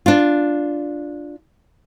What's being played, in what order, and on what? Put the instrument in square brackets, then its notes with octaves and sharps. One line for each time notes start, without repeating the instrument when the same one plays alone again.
[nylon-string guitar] D4 F4